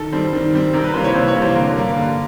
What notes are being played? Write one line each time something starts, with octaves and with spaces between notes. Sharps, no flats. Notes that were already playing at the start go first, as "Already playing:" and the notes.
Already playing: D#3 A4
G3 C4
D#3
G3 C4
C3 A#4
B4
E3 G3 A#3 C5
C#5
C3 C5
C#5
E3 G3 A#3
C5
D3 A#4
G3 A#3
D3